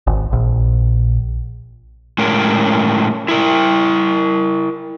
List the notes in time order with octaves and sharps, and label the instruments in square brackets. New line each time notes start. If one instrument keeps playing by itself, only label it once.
[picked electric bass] G#1
A#1
[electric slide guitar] A2 G#3 C#4 A#4
E4 A#4